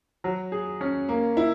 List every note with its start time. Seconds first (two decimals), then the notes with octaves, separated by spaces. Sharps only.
0.24 F#3
0.52 G#4
0.81 C#4
1.09 A#3
1.37 E4